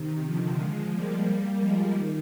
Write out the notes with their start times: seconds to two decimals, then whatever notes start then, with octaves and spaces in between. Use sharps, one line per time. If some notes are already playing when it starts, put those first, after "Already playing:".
Already playing: C3 D#3
0.25 D3 F3
0.59 F3 G#3
0.92 G3 A#3
1.58 F3 G#3
1.91 D#3